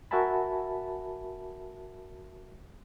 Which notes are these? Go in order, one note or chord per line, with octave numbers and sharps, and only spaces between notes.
F#4 A#4 E5 G#5 A5 B5